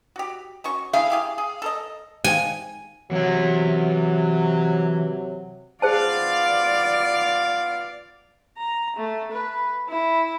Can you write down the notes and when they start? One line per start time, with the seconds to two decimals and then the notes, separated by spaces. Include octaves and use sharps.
0.16 F#4 G4
0.64 C#4 F#4 C#6
0.93 A3 E4 G#4 F5
1.10 E4 G4 G#4
1.38 G#4
1.62 A4 A#4 D#5
2.24 G#5
3.11 C3 E3 F#3 F#5
5.82 B3 F4 G#4 C5 D5 F5 A5
8.57 A#5
8.96 A3
9.32 B4
9.88 E4